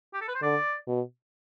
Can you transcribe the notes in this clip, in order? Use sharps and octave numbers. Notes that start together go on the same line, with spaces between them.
G4
A4
B4
C5
D3 D5
B2